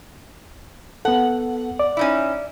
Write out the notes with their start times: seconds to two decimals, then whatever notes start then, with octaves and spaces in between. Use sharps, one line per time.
1.05 B3 A4 F#5
1.79 D5
1.97 C#4 D#4 E4